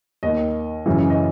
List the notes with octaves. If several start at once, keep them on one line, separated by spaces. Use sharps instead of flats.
D#2 D#3 D#5
F#2 C#3 E3
D#5